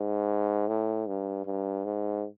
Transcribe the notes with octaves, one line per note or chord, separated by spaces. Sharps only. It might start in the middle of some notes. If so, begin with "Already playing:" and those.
Already playing: G#2
A2
G2
G2
G#2